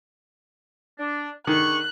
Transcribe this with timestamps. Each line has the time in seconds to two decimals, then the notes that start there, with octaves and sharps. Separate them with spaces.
0.98 D4
1.47 D3 D#3 G#4 C#6 F#6